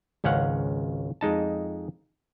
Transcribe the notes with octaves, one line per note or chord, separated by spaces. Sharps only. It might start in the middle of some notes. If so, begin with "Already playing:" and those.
G#1 C#2 C#4 F5 F#5
F2 G#3 D#4 A5